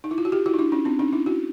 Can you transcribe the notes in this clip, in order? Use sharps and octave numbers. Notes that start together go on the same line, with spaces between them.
D#4
E4
F4
F#4
F4 G4
E4 F#4
D#4
D4 E4
C#4 D#4
C4 D4
C#4 D#4
D4 E4
E4 F#4